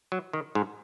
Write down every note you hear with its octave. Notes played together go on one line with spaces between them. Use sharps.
F#3
D#3
G#2